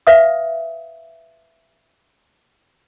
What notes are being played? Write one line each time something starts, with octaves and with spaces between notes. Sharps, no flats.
B4 E5 F5 D#6